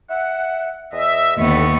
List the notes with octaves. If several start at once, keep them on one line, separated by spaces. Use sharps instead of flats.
E5 F#5
E2 D#5 E5
D#2 D3 B3 E5 C#6